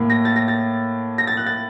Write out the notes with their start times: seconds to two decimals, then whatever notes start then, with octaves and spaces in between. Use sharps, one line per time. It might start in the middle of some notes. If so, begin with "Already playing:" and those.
Already playing: A2 A#3
0.10 A#6
0.25 A6
0.36 A#6
0.48 A6
1.18 A#6
1.27 A6
1.37 F#6
1.46 A6